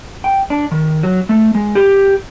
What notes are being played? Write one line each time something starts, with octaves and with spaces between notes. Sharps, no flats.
G5
D4
D#3
F#3
A3
G#3
G4